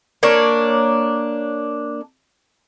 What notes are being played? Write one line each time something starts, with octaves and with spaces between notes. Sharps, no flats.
A#3 D4 C#5